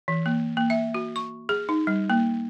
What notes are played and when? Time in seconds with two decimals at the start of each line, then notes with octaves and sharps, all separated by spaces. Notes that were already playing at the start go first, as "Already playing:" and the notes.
0.08 E3
0.26 A#3
0.57 A#3
0.70 E5
0.94 F#4
1.16 C#6
1.49 G#4
1.69 D#4
1.87 G3
2.10 A#3